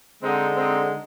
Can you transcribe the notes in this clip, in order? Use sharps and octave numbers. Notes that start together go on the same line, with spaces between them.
D3 G#3 C4 D#4
C4 D#4